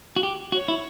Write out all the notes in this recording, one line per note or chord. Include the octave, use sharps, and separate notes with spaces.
F#4
G4
F#4 C#5
E4